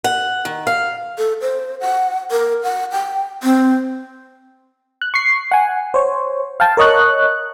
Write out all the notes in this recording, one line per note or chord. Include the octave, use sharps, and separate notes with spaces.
F#5
D#3
F5
A4
C5
F#5
A#4
F#5
G5
C4
F#6
C#6 C7
F#5 G#5
C5 C#5
F5 G5 A5
A#4 C#5 D#5 C#6 F#6